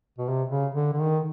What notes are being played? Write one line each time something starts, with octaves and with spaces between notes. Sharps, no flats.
B2
C3
C#3
D3
D3
D#3